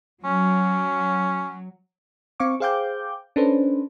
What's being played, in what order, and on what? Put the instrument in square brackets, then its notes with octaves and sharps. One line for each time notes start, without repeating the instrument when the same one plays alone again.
[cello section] F#3 [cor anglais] C#4
[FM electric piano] C4 F5 C#6 D6
G#4 C5 F5 G5 D6 G6
C#4 D4 A4 B4 C5